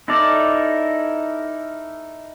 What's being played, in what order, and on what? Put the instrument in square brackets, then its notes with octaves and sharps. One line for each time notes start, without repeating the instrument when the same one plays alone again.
[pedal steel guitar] D#4 E4 A4 A#4 D5